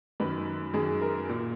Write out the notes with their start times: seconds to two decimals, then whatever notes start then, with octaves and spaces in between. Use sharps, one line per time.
0.20 F#2 D#3 B4
0.74 F#2 D#3 G#4
1.01 A#4
1.29 A#2